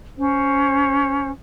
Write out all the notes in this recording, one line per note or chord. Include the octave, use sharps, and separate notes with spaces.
C#4 C5